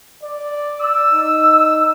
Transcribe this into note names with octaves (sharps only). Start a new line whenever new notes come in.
D5
E6
D#4